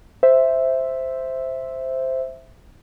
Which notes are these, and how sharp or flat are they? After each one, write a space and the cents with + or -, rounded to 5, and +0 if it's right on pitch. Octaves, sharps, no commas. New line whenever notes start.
C5 +0 E5 +0